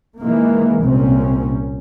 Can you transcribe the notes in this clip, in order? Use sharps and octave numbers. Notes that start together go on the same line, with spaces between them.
D#3 E3 G#3 A#3
C2 A#2 C4 C#4